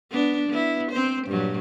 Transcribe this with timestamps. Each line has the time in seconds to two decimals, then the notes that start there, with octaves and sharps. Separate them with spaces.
0.11 B3 D4
0.49 B3 E4
0.91 C4 C5
1.28 G2 A#2 F#3